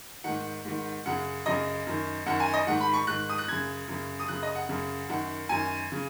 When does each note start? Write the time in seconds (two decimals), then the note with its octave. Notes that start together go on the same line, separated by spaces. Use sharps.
0.24 G#2 D#3 F#5
0.65 G#2 D#3
1.06 F#2 C#3 F#5
1.46 F#2 C#3 D#5
1.87 F#2 D#3
2.26 F#2 D#3 F#5
2.40 G#5
2.54 D#5
2.67 G#2 D#3 F#5
2.80 B5
2.94 C#6
3.07 G#2 D#3 F#6
3.30 D#6
3.38 F#6
3.48 F#2 C#3 G#6
3.88 F#2 C#3
4.19 D#6
4.28 F#2 C#3 F#6
4.43 D#5
4.55 F#5
4.69 F#2 C#3
5.09 F#2 D#3 F#5
5.49 F#2 D#3 G#5
5.92 C#3